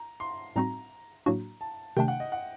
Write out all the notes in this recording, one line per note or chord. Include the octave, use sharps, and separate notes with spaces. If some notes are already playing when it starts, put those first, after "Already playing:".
Already playing: A#5
C6
A2 G3 C4 D#4 F#4 A#5
A2 F#3 A#3 D4 F#4
A5
C3 D#3 A3 D4 G5
F#5
D#5
F#5